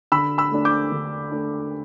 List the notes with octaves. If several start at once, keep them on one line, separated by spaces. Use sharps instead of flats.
D3 B5 E6
B5 E6
A3 D4
D6 G6
D3
A3 D4